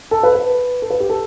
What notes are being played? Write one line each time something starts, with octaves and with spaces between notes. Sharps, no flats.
A4
B4
B4
A4
B4
G4
A4